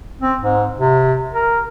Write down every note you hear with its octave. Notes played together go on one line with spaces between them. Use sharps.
C4
G#2
C3
A#4